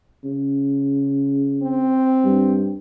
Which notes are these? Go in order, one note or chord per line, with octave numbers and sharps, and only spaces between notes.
C#3
C4
G2